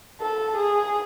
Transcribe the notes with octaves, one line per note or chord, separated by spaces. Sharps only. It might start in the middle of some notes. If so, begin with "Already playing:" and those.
A4
G#4